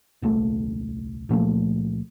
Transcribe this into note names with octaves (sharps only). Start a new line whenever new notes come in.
D#1 C2 A3
C#2 A#2 F3 A3